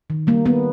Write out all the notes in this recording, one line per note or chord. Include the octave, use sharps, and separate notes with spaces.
D#3
G3 A#3
A#3 B3